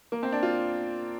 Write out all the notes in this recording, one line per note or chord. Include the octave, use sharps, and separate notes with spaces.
A#3
C4
D4
F4